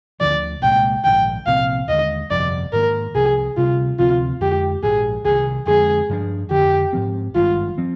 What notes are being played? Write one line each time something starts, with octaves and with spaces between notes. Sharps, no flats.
D2 D3 F3 D5
C2 A#2 G#3 G5
A#1 G#2 D#3 G5
C2 A#2 F3 C4 F5
D#2 D3 F3 G#3 D#5
G1 F2 C3 F3 D5
G#2 D#3 A#3 A#4
C2 C3 F3 G#4
D2 C3 G3 F4
D2 C3 F3 C4 F4
F2 D3 G#3 G4
A#1 G#2 F3 G#4
C2 C3 D#3 G#4
F2 D3 F3 G#3 G#4
G2 F3 A#3 D4
F2 D3 F3 G4
G#2 F3 C4
G#1 G2 D#3 G#3 F4
F3 C4